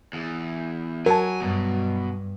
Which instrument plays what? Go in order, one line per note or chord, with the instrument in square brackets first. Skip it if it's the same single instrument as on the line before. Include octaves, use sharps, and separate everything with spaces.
[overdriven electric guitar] E2
[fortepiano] F#3 [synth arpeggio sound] A#4 A5 [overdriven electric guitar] G#5
[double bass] G2 [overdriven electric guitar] B2